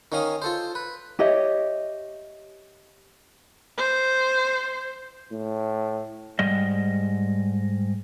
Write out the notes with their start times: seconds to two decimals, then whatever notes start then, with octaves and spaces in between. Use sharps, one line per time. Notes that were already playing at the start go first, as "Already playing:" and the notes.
0.12 D#3 C#4 F5 D#6
0.42 F4 A4 C5
0.75 B4
1.19 G4 C#5 D#5 E5
3.77 C5
5.31 A2
6.39 G#2 G3 D#5